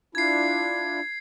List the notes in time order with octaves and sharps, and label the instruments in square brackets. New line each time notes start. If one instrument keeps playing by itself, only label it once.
[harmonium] D4 E4 F4 [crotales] G#6 C7